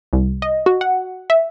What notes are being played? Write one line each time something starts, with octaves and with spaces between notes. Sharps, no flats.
C2
D#5
F#4
F#5
E5